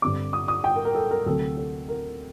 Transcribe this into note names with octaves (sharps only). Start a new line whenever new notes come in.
G2 D3 G3 C4 D6
D#6
D#6
G5
A#4
A#4
A4
A#4
D2 C3 F#3 A3 A4
A4
A#4